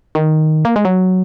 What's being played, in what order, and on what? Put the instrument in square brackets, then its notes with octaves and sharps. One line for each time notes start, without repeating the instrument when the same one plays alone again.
[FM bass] D#3
A#3
G#3
F#3